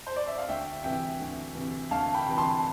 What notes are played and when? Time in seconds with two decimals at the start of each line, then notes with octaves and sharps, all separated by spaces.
0.07 C5
0.16 D5
0.27 E5
0.38 F5
0.48 D2 E5 G5
0.83 C3 E3 E5 G5
1.20 D2
1.55 C3 E3
1.90 D2 F5 A5
2.14 G5 B5
2.26 C3 E3
2.38 A5 C6